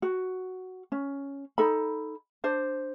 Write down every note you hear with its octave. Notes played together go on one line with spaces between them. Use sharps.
F#4
C#4
D#4 A4 B5
D4 C5